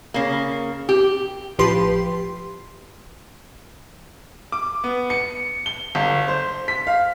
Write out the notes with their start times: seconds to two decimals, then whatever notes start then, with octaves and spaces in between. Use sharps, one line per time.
0.14 C#3 A#3
0.89 G4
1.59 A1 F3 G4 B4 C6
4.52 D6
4.84 B3
5.10 C#7
5.66 G7
5.95 G1
6.28 C5
6.68 B6
6.87 F5